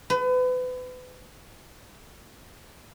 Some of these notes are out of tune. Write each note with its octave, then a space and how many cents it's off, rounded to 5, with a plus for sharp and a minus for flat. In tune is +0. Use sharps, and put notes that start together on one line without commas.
B4 +35